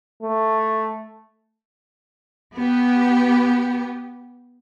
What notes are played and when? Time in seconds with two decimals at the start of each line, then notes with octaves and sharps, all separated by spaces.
0.22 A3
2.57 B3 G4